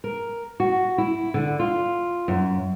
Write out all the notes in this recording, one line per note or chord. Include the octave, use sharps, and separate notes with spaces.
A#4
F#4
E4
D3
F4
F#2